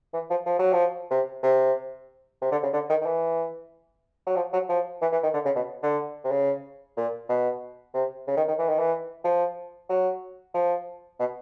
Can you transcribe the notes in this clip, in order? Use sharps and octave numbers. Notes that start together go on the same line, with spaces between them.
E3
F3
F3
F#3
F3
C3
C3
C3
D3
C#3
D3
D#3
D#3
E3
F#3
F3
F#3
F3
E3
E3
D#3
D3
C#3
B2
D3
C3
C#3
A#2
B2
C3
C#3
D#3
D#3
E3
D#3
E3
F3
F#3
F3
B2